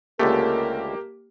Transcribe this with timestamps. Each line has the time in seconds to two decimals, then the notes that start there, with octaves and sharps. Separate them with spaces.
0.19 C#2 D3 A3 A#3 G4 A#4